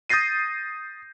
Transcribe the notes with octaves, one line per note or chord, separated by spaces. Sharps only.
D#6 G6 A6 A#6 C7 D#7